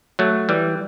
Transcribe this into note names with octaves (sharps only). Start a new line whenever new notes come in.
F#3 A3
E3 G3